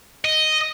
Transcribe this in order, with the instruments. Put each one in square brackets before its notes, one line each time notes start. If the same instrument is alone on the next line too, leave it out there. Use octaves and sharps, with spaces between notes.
[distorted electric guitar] D#5